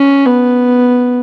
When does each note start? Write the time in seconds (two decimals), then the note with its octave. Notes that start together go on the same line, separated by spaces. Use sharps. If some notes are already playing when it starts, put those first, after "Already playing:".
Already playing: C#4
0.25 B3